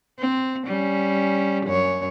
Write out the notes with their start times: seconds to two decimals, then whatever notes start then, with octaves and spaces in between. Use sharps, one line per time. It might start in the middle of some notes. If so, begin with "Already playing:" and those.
0.19 C4
0.67 G3 C#4
1.66 F#2 C#5